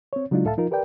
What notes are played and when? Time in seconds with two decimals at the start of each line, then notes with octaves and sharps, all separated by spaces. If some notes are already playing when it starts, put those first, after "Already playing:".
0.13 C4 C#5
0.31 C#3 F#3 G#3 D4 D#4 F4
0.44 C#2 A2 A4 E5 F5 A5
0.57 F3 D#4 F4 A#4
0.71 G4 A#4 B4 D5 G5